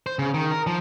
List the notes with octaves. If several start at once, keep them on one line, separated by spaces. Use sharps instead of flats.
C5
C#3
D#3
A#4
F3